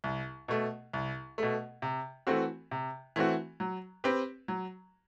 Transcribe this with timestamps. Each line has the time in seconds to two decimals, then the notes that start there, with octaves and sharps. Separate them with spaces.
0.04 C2
0.48 B2 A3
0.93 C2
1.38 B2 A3
1.82 C3
2.27 E3 A3 C4 F#4
2.71 C3
3.16 E3 A3 C4 F#4
3.60 F#3
4.04 C4 G4 B4
4.48 F#3